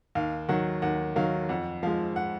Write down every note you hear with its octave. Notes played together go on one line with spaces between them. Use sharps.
D#2 F5
D#3 F#3 F#5
D#2 F#5
D#3 F#3 F5
F2 F#5
F3 G#3 F5
F#5